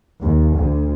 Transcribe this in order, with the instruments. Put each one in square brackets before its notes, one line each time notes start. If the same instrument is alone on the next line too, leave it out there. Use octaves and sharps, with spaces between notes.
[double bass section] D#2
D2